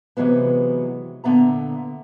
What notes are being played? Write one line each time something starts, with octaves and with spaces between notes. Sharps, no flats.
C3 E3 F#3 G#3 B3
A#2 D3 B3 E5 A#5